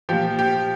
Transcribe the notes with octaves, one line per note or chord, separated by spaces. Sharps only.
A#2 F3 G4
G4